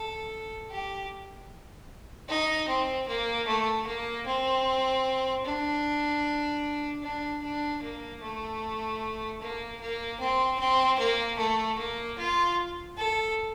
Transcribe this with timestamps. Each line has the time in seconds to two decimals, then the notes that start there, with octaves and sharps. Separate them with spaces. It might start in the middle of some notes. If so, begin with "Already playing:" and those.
Already playing: A4
0.70 G4
2.28 D#4
2.68 C4
3.08 A#3
3.47 A3
3.86 A#3
4.26 C4
5.45 D4
7.03 D4
7.43 D4
7.82 A#3
8.22 A3
9.41 A#3
9.80 A#3
10.20 C4
10.59 C4
10.99 A#3
11.38 A3
11.78 A#3
12.18 F4
12.97 A4